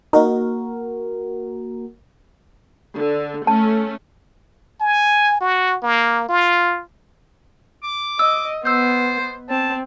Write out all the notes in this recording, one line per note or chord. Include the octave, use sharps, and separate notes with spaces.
A#3 D#4 F#4 A#4
D3
A3 C#4 A5
G#5
F#4
A#3
F4
D6
D#5 E6
B3 C5 E6 G6
C4 A5